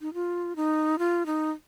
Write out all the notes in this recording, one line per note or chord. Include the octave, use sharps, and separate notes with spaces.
D#4
F4
D#4
F4
D#4